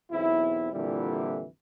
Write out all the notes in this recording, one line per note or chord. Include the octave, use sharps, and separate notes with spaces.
B1 E2 C4 E4
F2 A#2 D3 E3 G3 E4